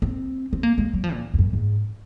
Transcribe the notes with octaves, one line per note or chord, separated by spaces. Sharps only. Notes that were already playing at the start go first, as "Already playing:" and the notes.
C4
C4
A#3
G#3
F#3
F3
A#2
F2
F#2
G#2